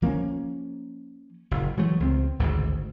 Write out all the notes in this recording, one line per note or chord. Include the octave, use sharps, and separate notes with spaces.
F3 A#3 C#4
F#1 A#2
E3 F#3 G#3 A3
C#2 C4
G#1 D2 G#2 C#3